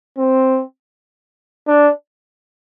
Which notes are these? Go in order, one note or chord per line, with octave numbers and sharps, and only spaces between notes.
C4
D4